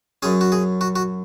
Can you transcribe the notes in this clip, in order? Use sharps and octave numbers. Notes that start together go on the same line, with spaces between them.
F#2 F#3 C#4 G#4
F#4
G#4
F#4
F#4